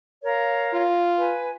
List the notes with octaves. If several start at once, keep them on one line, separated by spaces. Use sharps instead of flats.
A#4 C#5 F5
F4
B4 G#5